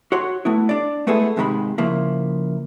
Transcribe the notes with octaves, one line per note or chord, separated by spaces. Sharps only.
F#4 C#5 C6
A3 B3 E4
D4 D5
G#3 A3 B3 E4 G#4 A4
D#2 G#2 C3 D#3 G#3 B5
C#3 F3 A#3 E4